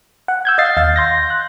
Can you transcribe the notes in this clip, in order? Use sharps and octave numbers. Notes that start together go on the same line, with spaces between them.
F#5
E6 G6 G#6
D#5 F5 A6 C7
D#2 F5 A6
C6 G6 A#6
F#6